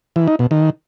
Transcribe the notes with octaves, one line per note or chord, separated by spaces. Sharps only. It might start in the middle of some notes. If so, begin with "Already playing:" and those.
E3
D#4
B2
D#3